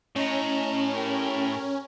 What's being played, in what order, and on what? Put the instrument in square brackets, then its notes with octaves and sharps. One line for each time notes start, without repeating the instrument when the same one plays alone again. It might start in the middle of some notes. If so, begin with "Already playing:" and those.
[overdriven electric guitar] A2 [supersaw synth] C#4 [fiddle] D#5 A#5
[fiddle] G4 A#4